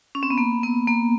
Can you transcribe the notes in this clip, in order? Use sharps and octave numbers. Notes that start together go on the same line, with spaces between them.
C#4
C4
B3
A#3
B3
A#3